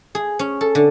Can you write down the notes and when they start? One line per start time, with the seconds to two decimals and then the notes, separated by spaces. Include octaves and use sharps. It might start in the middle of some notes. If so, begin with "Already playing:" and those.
0.15 G#4
0.39 C#4
0.61 A4
0.75 D3